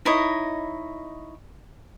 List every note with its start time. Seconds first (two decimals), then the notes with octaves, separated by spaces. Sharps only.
0.05 D#4 E4 C#5 D#5